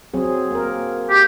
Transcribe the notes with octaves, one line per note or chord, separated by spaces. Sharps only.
F#3 C4 G#4
A#3 A#4
G4